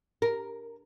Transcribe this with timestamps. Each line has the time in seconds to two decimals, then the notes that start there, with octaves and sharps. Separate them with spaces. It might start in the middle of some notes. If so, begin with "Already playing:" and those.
0.22 A#4